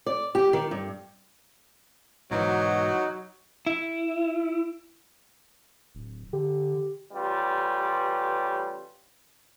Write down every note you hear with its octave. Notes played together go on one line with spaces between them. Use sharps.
D5
G4
D#3
G2
B1 G#2 E3 F#3 D#4 F#4
E4
D1
D3 G4
A1 G3 C#4 F4 B4